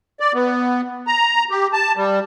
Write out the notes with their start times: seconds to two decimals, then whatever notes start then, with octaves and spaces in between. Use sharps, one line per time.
0.20 D5
0.34 B3
1.07 A#5
1.50 G4
1.73 A5
1.97 G3